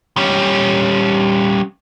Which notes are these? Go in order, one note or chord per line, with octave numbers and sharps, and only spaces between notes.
G3 C#4